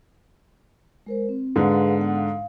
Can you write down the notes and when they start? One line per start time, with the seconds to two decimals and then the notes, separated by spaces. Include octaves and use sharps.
1.06 G#3 A#4 C5
1.29 C4
1.56 G#2 D3 G#4 B4 F5
1.97 B3 F#5
2.15 F5